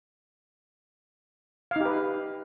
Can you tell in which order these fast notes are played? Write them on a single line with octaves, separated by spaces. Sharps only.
F5 D#4 G4 B4